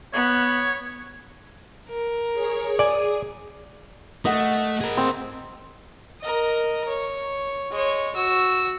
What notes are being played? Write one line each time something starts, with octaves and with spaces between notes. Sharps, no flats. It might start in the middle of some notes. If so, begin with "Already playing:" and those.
B3 C#5
A#4
G#4 C#5
G#4 D5 G#5 D#6
A3 D#5 F#5
G#4 A#4
C4
A#4 D#5
C#5
G#3 C#5
F#4 E6